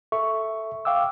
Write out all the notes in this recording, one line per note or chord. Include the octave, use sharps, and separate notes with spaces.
A4 E5 C#6
F5 G5 D6 E6